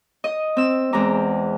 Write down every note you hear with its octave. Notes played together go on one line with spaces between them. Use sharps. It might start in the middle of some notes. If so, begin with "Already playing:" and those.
D#5 D#6
C4 E6
E2 G#3 C4 A#5 D6